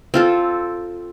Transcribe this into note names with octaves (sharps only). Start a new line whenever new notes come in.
C4 F4 A4